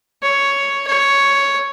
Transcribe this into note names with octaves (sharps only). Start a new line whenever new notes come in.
C#5
C#5